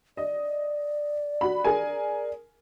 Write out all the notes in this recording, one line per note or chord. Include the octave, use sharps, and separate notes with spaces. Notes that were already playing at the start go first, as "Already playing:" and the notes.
D5 D#5
F#4 B5
G#4 A#4 G#5